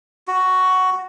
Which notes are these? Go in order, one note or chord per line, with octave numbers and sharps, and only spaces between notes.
F#4